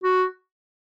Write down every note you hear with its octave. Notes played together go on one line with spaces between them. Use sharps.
F#4